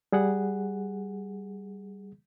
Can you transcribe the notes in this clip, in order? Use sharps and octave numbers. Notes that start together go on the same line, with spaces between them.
G3 G#4 F#5